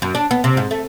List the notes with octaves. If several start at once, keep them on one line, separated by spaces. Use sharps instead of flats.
F#2
D4
B3
C3
G#2
A3